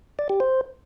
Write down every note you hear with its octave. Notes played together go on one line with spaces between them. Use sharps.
D5
G4
C5